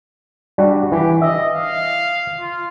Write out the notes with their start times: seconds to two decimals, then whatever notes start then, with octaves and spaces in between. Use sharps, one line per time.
0.58 G3 D4 F#4
0.92 E3 G4
1.22 D#5 E5
1.53 F5
2.40 F4